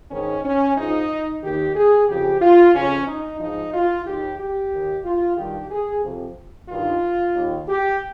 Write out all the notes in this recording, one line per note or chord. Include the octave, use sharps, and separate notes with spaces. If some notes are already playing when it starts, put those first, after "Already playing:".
G#2 D#3 C#4
C#4
G#2 F3 D#4
D#2 D#3 G4
G#4
F2 C#3 F3 G4
F4
F2 C#3 F3 C#4
D#4
G#2 F3 D#4
F4
D#2 D#3 G4
G4
D#2 D#3
F4
G2 D#3 G4
G#4
F2 C3 F3
G2 D#3 F4
D#2 D#3
G4